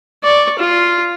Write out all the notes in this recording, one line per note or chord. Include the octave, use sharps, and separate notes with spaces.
D5 C#6
F4